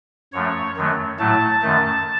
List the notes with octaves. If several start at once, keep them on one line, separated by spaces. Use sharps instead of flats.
F#2 F3 A3 C#5
F#2 D#3 F#3 A3
A2 F#3 A3 A5
F#2 D#3 A3